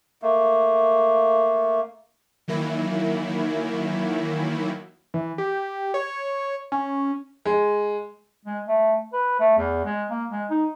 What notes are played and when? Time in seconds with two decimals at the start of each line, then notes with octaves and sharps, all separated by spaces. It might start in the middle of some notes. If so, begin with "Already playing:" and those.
0.22 A3 A#3
2.48 D#3 E3 F#3 A#3 E4
5.14 E3
5.38 G4
5.94 C#5
6.72 C#4
7.45 G#3
8.45 G#3
8.68 A3
9.13 B4
9.40 A3
9.58 E2
9.85 G#3
10.11 A#3
10.31 G#3
10.50 D#4